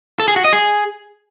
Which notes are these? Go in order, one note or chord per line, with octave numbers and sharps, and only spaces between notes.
A4
G#4
F#4
D#5
G#4